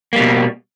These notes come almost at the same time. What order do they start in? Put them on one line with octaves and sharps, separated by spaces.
A#3 G3 B2